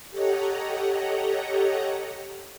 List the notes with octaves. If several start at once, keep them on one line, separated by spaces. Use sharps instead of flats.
G4 A4 C#5 D#5 F#5 A#5